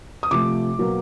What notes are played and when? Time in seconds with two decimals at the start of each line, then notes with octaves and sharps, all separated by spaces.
0.23 D#6
0.31 C3 F3 A3 D6
0.79 B2 F#3 A#3